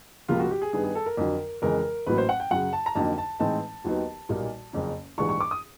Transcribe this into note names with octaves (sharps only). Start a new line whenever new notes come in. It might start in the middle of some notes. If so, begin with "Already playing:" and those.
C#2 C3 F3 A#3 F4
F#4
G4
G#4
G2 D#3 G3 B3 G#4
G#4
A4
A#4
F2 D3 F#3
F2 C#3 E3 G#3 A#4
A1 A2 F#3 A#3 B4
C5
F#5
G5
F#2 C#3 F#3 F#5
A5
A#5
F2 D3 F#3 A#3 D#4 A5
A5
A2 E3 G#3 C4 D#4 A5
D#2 D#3 F#3 B3 D#4
B1 A#2 G3 A#3 D#4
F#1 F2 C#3
A#1 G#2 E3 G3 C#6
C#6
D6
D#6